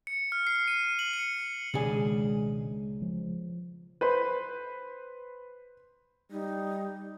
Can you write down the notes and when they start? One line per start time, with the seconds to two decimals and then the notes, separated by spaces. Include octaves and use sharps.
0.07 C#7
0.32 F6
0.47 C7
0.68 D#7
0.99 F#7
1.13 C#7
1.74 C#2 B2 D#3 G#3 D4 G#4
3.02 F3
4.01 B4 C5 B5
6.31 G3 D#4